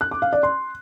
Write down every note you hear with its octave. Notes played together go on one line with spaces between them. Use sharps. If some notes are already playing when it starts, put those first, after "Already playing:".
F#6
D6
F5
D5
C6